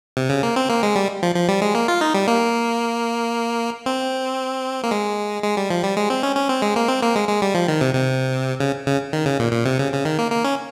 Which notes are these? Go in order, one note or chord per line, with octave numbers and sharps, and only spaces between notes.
C3
C#3
A#3
C4
A#3
G#3
G3
F3
F3
G3
G#3
A#3
F4
D#4
G3
A#3
C4
A#3
G#3
G#3
G3
F3
G3
G#3
C4
C#4
C#4
C4
G#3
A#3
C4
A#3
G#3
G#3
G3
F3
D#3
C3
C3
C#3
C#3
D#3
C#3
A#2
A#2
C3
C#3
C#3
D#3
A#3
A#3
C#4